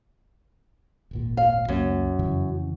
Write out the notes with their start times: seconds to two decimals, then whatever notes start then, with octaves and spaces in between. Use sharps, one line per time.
1.11 D#1 G#1 A#2
1.37 F5
1.68 C#2 F#2 A#3
2.19 F2 C#3 E3